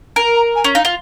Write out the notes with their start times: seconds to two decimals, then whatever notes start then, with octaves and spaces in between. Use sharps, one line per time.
0.16 A#4
0.36 A#5
0.55 G#5
0.64 C#4
0.75 D#4 F5
0.85 F4